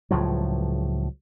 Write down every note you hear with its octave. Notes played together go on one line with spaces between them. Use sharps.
C#2 A2 F3 F#3